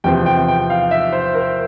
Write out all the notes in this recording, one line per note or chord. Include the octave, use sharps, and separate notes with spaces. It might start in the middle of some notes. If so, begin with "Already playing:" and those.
E2 C3 F3 C4 G5
G5
G5
F5
E5
C5
A#4